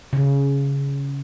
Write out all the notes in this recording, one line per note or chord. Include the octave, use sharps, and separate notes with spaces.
C#3